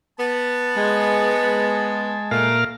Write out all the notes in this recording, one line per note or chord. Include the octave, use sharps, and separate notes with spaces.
B3 A5
G#3
A#2 A3 A#4 F5